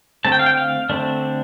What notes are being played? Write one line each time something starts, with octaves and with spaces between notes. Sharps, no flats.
D3 A3 C4 A5
G5
F5
G5
F5
D3 A3 C4 D4